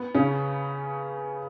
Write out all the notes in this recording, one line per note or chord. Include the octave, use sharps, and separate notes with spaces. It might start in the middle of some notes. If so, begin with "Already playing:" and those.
Already playing: B3
C#3 C#4